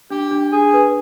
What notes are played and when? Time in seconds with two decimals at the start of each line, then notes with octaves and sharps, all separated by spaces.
0.10 D4 G4
0.31 D4
0.52 D4 G#4
0.73 B4